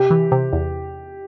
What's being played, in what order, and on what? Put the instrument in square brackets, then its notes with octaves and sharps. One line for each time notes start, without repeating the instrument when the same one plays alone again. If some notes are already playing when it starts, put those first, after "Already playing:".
Already playing: [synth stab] C3 [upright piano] G4
[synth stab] E3
C3
E2